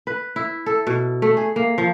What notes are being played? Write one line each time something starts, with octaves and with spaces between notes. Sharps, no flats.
B4
E4
A4
B2
A3
G#4
A#3
F3